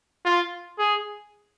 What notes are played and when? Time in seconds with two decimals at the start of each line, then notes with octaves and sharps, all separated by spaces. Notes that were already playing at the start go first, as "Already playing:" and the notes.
0.25 F4
0.79 G#4